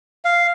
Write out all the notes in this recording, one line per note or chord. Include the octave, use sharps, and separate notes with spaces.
F5